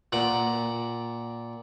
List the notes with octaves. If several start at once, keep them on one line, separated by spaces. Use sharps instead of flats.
A#2 F#5 D6